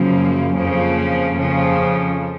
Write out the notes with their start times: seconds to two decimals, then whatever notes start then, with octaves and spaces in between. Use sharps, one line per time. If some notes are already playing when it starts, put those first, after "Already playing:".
Already playing: F#2 C#3 F3 A#3
0.56 F2 C#3 F3 A#3
1.36 F2 C#3 F3